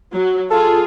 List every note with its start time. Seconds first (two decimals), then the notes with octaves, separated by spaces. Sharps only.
0.15 F#3
0.50 F4 G#4 A4